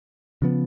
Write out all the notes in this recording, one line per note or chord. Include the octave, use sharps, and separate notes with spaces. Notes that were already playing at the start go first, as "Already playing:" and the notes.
C#3 F3 B3